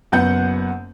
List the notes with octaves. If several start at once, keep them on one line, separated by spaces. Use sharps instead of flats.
F#1 F#2 B3 F#5 G6